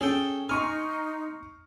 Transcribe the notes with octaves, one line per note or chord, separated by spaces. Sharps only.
C#4 G#4 A4 G5
D#4 G#5 C6 C#6 F6